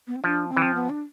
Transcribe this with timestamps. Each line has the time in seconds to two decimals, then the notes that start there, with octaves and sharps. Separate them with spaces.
0.07 B3
0.16 C4
0.24 F3 D4
0.49 C4
0.57 E3
0.62 F3
0.75 B3
0.90 D4